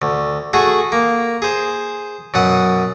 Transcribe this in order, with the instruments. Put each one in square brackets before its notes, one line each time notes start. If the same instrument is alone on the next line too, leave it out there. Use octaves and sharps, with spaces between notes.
[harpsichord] D2
A3 F#4 G#4
A#3
G#4 C5
F#2 B2 F#5 D#6